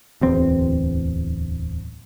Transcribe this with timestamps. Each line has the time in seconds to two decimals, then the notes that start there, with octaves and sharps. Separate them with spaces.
0.21 D1 E2 C4